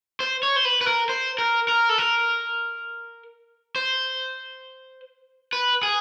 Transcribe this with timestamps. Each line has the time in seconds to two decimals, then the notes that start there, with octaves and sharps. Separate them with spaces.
0.20 C5
0.43 C#5
0.56 C5
0.65 B4
0.81 B4
0.87 A#4
1.09 C5
1.38 A#4
1.68 A#4
1.89 A4
1.98 A#4
3.76 C5
5.53 B4
5.83 G#4